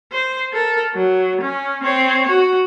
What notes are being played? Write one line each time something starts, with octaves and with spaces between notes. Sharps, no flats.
C5
A4 A#4
F#3
C#4
C4 C#5
F#4